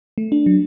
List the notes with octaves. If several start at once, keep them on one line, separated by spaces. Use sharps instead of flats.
A3
D4
F#3